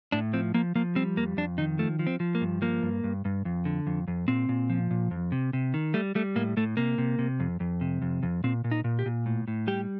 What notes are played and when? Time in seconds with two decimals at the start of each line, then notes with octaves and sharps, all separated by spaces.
0.12 A2 D4
0.33 F3 C4
0.54 F3 A#3
0.75 F3 A#3
0.95 G3 C4
1.17 F2 A#3
1.37 F2 D4
1.58 D#3 D#4
1.79 F3 A3
1.99 F3
2.07 C4
2.20 F3
2.35 A#3
2.41 G2
2.62 F3 A#3
2.83 G2
3.04 G2
3.25 G2
3.45 F2
3.65 D3
3.87 F2
4.08 F2
4.28 A#2 C4
4.49 A#2
4.70 F3
4.91 A#2
5.11 F2
5.32 C3
5.53 C3
5.74 D#3
5.94 G3 A3
6.15 G3 A3
6.36 A2 A#3
6.57 A2 A3
6.77 C3 A#3
6.98 C3
7.19 C3
7.40 F2
7.60 F2
7.81 C3
8.02 F2
8.23 F2
8.44 A#2 C4
8.64 A#2
8.71 D#4
8.84 A#2
8.99 G4
9.06 A#2
9.26 A2
9.48 A2
9.67 G3 G4